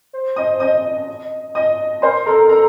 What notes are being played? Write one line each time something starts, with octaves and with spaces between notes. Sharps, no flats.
C5
D#5 D#6
D#5 D#6
D#5 D#6
A#4 C5 C6
A4 A#4 A#5
A#4 A#5